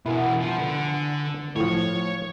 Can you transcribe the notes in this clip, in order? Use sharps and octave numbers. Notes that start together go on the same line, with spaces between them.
B2 E3 B3 E4 A#4 G#5
F3
D3 B4
A2 F3 C#5